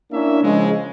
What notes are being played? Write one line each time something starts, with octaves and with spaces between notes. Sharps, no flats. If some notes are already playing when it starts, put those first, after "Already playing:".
A#3 C#4 D4 E4 E5
C#3 F3 G#3